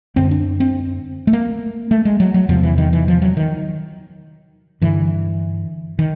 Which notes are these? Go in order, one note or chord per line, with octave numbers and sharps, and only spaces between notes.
F#2 D3 C4
D4
C4
A3
A#3
A3
G#3
F#3
F#3
E2 C3 F3
E3
D#3
E3
F3
F#3
D#3
G2 D3 E3
D#3